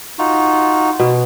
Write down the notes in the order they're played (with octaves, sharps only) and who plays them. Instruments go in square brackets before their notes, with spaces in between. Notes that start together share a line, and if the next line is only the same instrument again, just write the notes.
[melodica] D#4 F4 F#4
[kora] B2